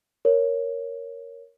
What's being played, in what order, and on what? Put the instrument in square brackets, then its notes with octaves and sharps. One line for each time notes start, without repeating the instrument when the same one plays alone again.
[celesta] A#4 C#5